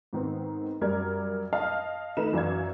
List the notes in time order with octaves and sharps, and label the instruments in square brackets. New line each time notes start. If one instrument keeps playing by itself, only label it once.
[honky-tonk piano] G#2 D#3 B3 C4
F#2 G3 A#4 D5 G#6
D#5 F5 A5 F6
D#3 A3 D#4 B4 A#5 E7
F#2 E3 D5 F5 G#6